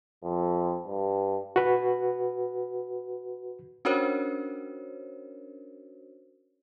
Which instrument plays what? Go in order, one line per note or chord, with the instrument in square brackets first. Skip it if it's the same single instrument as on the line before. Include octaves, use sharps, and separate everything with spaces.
[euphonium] F2
G2
[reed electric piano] F#4 B4
[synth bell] C#4 D4 F#4 A#4 C5 C#5